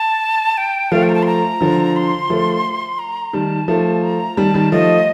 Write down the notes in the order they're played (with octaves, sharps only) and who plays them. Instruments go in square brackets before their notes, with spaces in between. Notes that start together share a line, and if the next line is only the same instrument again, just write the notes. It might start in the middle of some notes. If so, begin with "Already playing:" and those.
Already playing: [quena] A5
G5
[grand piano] F3 A3 [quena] F5
[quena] G5
A#5
A5
C6
A#5
[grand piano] D3 F3
[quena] C6
[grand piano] F3 A3
[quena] A#5
[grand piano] D#3 G3 [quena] A5
[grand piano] F3 A3
[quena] A#5
[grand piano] D#3 G3 [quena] A5
[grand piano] D#3 G3
[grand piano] F3 A3 [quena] D#5